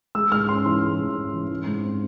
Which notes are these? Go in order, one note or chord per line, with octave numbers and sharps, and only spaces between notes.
G#3 E6
G#2 F6
C#4 C6
E3 C6
G#3
G#2
C#4
E3
G#3
G#2
C4